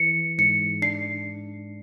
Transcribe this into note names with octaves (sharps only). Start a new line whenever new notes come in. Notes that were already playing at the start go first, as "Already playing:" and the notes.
Already playing: E3 C#7
G#2 C#7
D4 C7